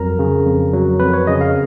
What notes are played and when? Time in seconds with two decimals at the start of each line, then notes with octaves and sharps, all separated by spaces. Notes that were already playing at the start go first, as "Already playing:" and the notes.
Already playing: F2 F#3 A#4 A#5
0.19 C#3
0.46 F2
0.73 F#3
1.00 F2 B4
1.13 C#5
1.27 C#3 D#5
1.41 F5